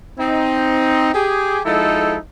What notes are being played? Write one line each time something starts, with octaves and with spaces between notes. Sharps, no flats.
C4 D#4
G4 G#4
F3 G#3 D#4 E4 A4